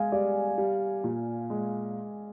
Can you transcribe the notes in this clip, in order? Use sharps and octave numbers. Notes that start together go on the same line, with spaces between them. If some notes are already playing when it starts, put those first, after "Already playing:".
Already playing: G#3 F5 G#5
G3 D5
G3
A#2
G#3